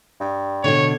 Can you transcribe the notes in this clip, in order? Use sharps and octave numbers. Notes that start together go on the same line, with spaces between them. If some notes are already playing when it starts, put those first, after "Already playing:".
G2
B2 D3 C#5